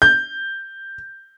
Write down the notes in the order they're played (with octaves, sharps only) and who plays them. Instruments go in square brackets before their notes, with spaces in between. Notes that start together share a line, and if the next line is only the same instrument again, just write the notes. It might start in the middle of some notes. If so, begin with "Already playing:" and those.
[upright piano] G6